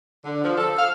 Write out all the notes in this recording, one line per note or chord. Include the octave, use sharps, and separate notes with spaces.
D3
F3
A4
F5